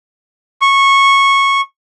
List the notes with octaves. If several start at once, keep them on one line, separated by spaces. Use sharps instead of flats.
C#6